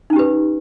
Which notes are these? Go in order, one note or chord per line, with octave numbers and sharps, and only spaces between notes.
C#4 D#4 G4 B4